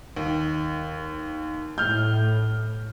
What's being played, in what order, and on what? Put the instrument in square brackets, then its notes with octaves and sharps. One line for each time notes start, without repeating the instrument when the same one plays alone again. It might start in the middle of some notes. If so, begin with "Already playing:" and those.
[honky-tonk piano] D#2
[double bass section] A2 [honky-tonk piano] F6 G6